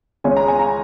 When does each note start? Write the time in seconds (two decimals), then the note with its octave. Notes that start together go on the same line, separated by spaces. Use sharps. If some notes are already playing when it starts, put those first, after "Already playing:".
0.24 C#2 C#3 G#3 C#4 G#5
0.37 A#5
0.48 G#5
0.59 A#5